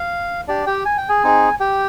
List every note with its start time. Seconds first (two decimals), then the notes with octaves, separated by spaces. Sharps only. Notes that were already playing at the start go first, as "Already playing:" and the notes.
Already playing: F5
0.48 D4 G4 D5
0.66 G4 G5
0.85 G#5
0.97 G5
1.08 G#4 G#5
1.24 C4 D#4 G#4
1.60 G4 G5